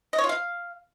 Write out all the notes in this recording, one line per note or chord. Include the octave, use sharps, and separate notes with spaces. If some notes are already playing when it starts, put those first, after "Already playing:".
D#5
C#5
F4
F5